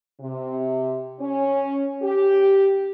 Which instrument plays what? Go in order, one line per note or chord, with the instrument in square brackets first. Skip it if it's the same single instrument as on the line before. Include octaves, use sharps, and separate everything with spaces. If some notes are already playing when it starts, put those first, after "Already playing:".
[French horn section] C3
C#4
G4